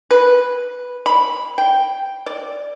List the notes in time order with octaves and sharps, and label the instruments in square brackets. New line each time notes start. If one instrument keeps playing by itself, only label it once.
[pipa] B4
B5
G5
D5